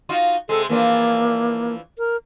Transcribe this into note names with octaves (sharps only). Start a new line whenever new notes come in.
D#4 F4 F#4
C3 G#3 A4
E3 F3 A#3 D4
A#4